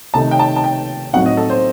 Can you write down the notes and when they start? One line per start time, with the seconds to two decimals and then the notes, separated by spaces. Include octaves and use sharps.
0.14 C3 D#3 A3 D#4 A5
0.31 G5
0.39 A5
0.56 A5
0.64 G5
1.13 A2 F#3 C4 D#4 F#4 F#5
1.26 D#5
1.37 A4
1.50 C5